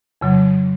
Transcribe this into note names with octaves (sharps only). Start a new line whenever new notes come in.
F2 C#3 F#3